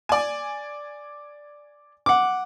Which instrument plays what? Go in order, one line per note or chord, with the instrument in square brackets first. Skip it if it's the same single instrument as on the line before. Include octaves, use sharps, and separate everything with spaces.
[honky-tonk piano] D5 G#5
[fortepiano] F#5 D6